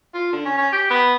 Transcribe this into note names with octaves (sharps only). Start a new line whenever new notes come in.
F4
D3
C#4
C#4
G4
B3